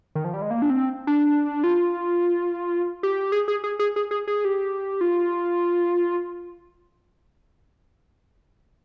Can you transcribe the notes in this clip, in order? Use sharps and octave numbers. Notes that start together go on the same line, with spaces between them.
D#3
F3
G3
G#3
A#3
D4
C4
D4
F4
G4
G#4
G#4
G#4
G#4
G#4
G#4
G#4
G4
F4